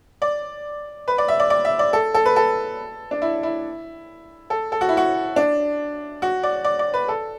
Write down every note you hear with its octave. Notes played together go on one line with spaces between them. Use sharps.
D5
B4
D5
E5
D5
D5
E5
D5
A4
A4
B4
A4
D4
E4
E4
A4
A4
F#4
E4
F#4
D4
F#4
D5
D5
D5
B4
A4